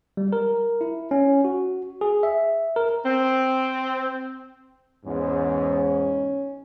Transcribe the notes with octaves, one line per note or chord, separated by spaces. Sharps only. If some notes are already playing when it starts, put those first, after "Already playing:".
G3
A#4
E4
C#4
F#4
G#4
E5
A#4
C4
E2 G#2 C#4